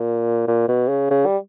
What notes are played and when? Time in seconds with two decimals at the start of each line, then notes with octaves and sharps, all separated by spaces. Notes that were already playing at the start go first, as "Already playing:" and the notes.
Already playing: A#2
0.48 A#2
0.68 B2
0.89 C#3
1.10 C#3
1.26 G3